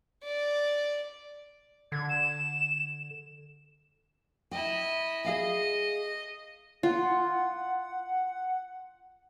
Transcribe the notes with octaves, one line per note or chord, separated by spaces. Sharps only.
D5
D3 G#6
E7
E4 D#5 G5
G#4 D#5 F5 G#5
F4 F#5